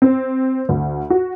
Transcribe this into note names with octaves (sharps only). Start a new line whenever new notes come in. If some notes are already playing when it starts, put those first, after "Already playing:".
C4
D2
F#4